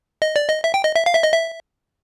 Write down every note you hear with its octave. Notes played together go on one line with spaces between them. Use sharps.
D#5
D5
D#5
E5
G5
D#5
E5
F5
E5
D#5
E5